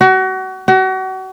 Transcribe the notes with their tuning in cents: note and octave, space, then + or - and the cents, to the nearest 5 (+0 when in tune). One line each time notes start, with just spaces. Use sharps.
F#4 +30
F#4 +35